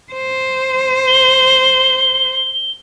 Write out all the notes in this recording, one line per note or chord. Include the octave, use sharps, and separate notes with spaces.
C5
G7